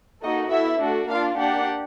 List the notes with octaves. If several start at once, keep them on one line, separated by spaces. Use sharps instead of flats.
A#3 D#4 F#4 A4 D#5
B3 E4 A4 E5
A3 D4 F#4
A#3 D4 F4 F5
A#3 D4 G4 F#5